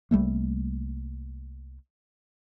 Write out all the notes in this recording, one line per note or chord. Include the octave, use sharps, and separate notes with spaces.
C2 G3 A3 A#3